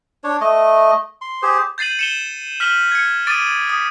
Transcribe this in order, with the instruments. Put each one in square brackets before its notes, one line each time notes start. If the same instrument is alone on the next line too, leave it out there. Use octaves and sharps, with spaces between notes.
[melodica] D4 C#5
A3 D#5
C6
G4 G#4 C5
[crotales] G6 A6 C7 D#7 F#7
C#7 E7 G7
F6 B6 E7 F#7 G7
G#6 C#7
D6 D#6 A6 D7 D#7
D#6